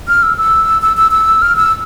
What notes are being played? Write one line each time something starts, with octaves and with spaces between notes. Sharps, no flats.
F6
E6
E6
E6
E6
E6
F6
E6